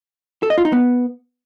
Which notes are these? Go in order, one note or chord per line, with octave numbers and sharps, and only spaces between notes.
A4
D#5
F4
D#4
B3